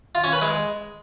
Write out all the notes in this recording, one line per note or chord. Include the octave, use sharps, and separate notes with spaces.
F4
C#4
B4
G#3